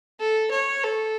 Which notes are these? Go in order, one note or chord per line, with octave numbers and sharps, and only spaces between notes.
A4
C#5
A4